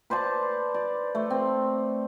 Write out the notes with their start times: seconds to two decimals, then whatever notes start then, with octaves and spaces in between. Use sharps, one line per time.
0.10 B4 C5 D5 A5
0.74 D5
1.15 A3
1.30 C4